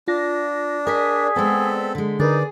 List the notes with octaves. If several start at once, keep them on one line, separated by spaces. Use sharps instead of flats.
D4 F4 A#6
G#4 A#4 D5 D#5 B6
G#3 B3 C4 A4
D3 G#3
D3 D#4 G#4 A#4 B4 D5